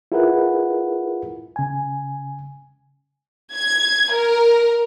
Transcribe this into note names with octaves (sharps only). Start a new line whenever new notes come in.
E4 F4 G#4 A#4 B4 F#5
C#3 G#5
G#6
A#4